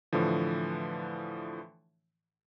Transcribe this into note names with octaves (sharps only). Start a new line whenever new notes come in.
A2 D3 E3 F3